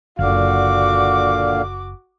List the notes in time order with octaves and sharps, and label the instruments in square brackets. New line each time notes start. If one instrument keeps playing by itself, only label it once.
[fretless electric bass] F#1 [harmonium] A#2 D3 F5 [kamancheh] F#4 D6